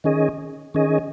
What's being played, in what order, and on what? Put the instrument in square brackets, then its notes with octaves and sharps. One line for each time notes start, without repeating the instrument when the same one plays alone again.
[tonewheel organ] D#3 C#4 G#4 D#5
D#3 C#4 G#4 D#5